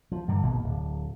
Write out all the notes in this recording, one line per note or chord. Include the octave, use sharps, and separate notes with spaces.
F3
G2 D3 D#3
G#1 B2 A#3
D1